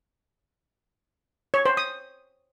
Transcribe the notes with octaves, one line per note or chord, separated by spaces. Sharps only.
C#5
C5
D#6